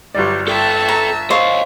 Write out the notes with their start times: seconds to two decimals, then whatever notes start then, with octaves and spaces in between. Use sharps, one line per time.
0.15 G1 F#3 G3 D5
0.48 A4 E5 G5 A5
0.89 A#5
1.31 C5 C#5 D#5 F5